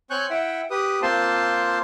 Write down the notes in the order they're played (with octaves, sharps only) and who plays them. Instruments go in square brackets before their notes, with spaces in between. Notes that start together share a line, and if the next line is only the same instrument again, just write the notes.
[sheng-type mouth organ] C4 C#5 G#5 C#6 F#6 G6
E4 E5 F#5 G5
G4 B4 D#6
A#3 C4 F4 C5 A5 C6